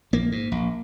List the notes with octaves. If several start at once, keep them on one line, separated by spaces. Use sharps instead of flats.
A#1 A#3
G#2
A#1